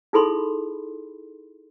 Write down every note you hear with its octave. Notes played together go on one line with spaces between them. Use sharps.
D#4 E4 G#4 A4 B5 C6